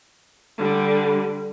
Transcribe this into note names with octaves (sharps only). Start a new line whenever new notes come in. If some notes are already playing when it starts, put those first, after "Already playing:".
D3 G3